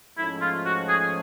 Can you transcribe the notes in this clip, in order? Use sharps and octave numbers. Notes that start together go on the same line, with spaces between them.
G#2 F3 A3 C#4 E4
F4
F#4
G#4